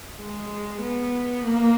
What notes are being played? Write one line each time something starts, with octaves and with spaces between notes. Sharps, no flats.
G#3
B3
A#3